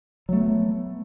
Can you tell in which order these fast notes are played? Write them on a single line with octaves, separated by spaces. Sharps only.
F#3 A3 B3